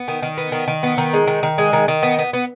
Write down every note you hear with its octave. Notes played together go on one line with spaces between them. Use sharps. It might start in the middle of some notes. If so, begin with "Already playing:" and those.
Already playing: B3
D#3
D#3
B3
D#3
D#3
B3
D#3
G#3
D#3
D#3
G#3
D#3
D#3
B3
B3
B3